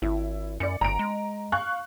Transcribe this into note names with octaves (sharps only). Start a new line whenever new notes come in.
G#1 E4
F#2 D5 C#7
G1 A#5 D7
G#3
F5 C#6 F#6